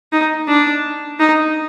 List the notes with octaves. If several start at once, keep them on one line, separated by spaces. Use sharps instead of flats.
D#4
D4
D#4